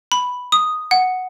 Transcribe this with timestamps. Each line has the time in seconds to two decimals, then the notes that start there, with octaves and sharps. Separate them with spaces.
0.12 B5
0.52 D#6
0.91 F#5